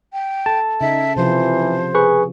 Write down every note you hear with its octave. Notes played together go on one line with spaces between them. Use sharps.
G5
A4 A5
C#3 D#4 E5
C3 E3 F3 F4 C5
G#4 B4 C#6